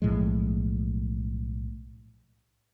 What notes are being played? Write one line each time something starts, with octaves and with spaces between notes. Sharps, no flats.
B1 A2 F3 G#3